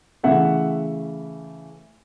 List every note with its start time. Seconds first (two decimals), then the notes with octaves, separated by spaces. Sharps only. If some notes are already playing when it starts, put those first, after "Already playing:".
0.23 C#3 E3 A3 E5 F#5